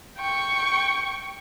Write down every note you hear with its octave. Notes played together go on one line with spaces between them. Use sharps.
G5 C#6